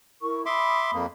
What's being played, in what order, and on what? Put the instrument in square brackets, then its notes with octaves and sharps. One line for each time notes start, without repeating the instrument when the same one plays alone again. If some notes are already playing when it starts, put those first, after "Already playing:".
[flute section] E4 A#4 C#6
[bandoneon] E5 C6 D6 [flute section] B5 D#6
[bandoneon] F2 A#3